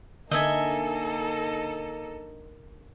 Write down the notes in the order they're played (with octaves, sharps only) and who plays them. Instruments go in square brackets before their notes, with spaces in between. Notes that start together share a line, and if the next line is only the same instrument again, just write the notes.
[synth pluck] D3 [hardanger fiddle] A#3 D#4 [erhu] A4 [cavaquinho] D#5 E5 G#5